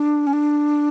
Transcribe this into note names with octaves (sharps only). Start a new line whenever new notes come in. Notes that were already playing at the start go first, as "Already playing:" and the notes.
Already playing: D4
C#4
D4